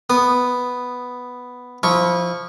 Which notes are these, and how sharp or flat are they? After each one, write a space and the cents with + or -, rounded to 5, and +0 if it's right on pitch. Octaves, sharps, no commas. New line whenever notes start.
B3 +0 D#6 -25
F3 +0 E4 -30 C#6 +0